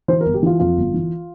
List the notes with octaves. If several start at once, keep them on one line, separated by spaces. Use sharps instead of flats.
E3 C5
G1 A#4
G4
E3 F4
F2 F4
G1
E3